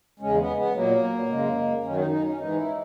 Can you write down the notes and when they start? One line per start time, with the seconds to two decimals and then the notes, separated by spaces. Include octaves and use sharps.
0.20 E2 C#3 G#3 C#4
0.38 B3
0.57 B3
0.74 A#2 F#3 A#3
1.29 F#2 C#3 G#3
1.83 F#2 D#3 F#3 C#4
1.97 D#4
2.10 D#4
2.25 C#4
2.39 G#2 E3 G#3 D#4
2.56 E4